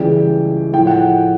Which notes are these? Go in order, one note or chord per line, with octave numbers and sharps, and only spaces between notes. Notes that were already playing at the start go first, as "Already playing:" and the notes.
Already playing: C#2 C#3 E3 G3 G5
A2 F3 G5
F#5